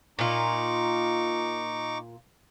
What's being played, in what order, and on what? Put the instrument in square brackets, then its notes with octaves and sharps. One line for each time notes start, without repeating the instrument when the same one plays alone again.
[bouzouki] A#2 F4 [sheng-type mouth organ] D#4 C#6 D6